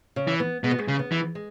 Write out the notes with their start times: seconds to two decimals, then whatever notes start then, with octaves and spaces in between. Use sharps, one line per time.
0.16 C#3
0.27 E3
0.40 B3
0.64 B2 G#3
0.71 B3
0.79 G#3
0.88 C#3
0.99 B3
1.12 E3
1.35 G#3